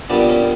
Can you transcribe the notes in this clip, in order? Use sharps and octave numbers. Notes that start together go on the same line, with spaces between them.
A#2 G3 B3 D4
C#4